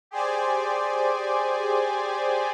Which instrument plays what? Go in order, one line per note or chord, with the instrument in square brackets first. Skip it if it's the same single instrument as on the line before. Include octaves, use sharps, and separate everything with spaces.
[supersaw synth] G4 G#4 C5 D5 G#5